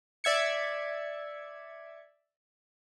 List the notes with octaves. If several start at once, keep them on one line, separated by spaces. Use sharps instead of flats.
D5 E5 G#6 C#7